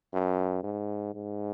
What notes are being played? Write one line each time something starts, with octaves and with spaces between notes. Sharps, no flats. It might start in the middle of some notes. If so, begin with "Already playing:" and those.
F#2
G#2
G#2